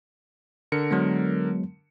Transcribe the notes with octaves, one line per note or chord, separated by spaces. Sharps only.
D3 A#4 C#7
F#3 G#3 B3